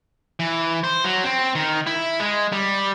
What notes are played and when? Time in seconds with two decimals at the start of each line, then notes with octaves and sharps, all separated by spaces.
0.39 E3
0.84 C5
1.04 F#3
1.24 C4
1.55 D#3
1.87 E4
2.20 G#3
2.52 G3